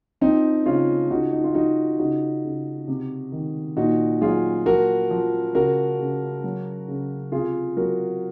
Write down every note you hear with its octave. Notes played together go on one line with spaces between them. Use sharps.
F3 C4 D#4
C#3 C#4 F4
C#3 D#4 F#4
D#4
F4
F3 D#4 F#4
C#3 D#4 F#4
C#3
C3
D#3
A#2 D#4 F#4
F#3 F4 G#4
F3 F#4 A#4
F3
C#3 F#4 A#4
C#3
F#3
C#3
C3 F4 G#4
F#3 F#4 A#4